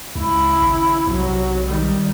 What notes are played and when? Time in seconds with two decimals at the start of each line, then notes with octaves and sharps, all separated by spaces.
0.15 C#2 C#3 E4
0.62 G#1
1.07 B1 C3 F#3
1.66 D#3 G3